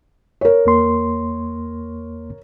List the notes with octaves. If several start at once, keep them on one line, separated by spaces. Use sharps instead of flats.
A#4 C#5
E2 A#3 C6